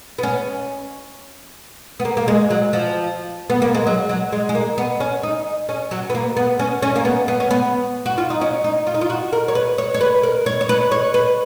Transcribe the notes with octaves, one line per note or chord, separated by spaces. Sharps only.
B3
C#4
B3
A#3
A#3
G#3
F#3
F3
B3
A#3
G#3
F#3
F#3
G#3
G#3
A#3
B3
C#4
D#4
C#4
F#3
B3
A#3
B3
C#4
C#4
A#3
B3
B3
C#4
B3
F#4
F4
D#4
C#4
D#4
F4
D#4
F4
F#4
A#4
C#5
B4
C#5
C#5
B4
A#4
C#5
C#5
B4
C#5
B4